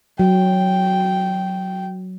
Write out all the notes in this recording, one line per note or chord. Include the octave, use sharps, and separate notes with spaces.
F#3 G5